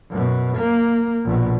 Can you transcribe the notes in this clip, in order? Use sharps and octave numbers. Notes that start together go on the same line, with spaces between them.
F#2 B2
A#3
A#1 B2